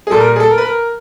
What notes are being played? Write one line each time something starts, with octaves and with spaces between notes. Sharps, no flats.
G#4
A#2 G3 A4
A#4
G#4
A4
A#4
B4
A#4